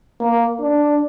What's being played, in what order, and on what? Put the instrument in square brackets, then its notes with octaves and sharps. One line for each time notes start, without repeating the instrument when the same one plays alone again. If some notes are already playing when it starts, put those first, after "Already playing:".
[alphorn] A#3
D4